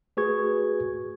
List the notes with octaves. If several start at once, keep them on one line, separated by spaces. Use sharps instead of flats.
A3 F#4 G#4 B4 C#6 G#6